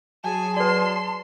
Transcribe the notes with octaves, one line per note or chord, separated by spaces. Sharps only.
F#3 G#4 G#5 A5
B4 D5 C6